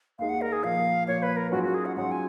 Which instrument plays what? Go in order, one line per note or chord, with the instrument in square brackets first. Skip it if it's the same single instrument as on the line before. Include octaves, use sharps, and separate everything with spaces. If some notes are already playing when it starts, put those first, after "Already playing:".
[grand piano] D#2 D#3 G#3 D#4 [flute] F5
[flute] F#5
A#4
G#4
[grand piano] A#2 F3 A#3 [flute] F5
[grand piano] A#2 F3 A#3 [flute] C#5
[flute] B4
A#4
[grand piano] G#2 F#3 C#4 F4 [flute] F#4
[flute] F#4
G#4
F#5
[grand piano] G#2 F#3 C#4 F4 [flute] F#5
[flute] G#5